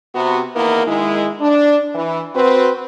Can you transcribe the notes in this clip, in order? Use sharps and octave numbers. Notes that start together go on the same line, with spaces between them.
C3 B3 F#4
E2 D#3 A#3 B3 E4 A#4
D#3 G#3 E4
D4
E3
C4 F#4 B4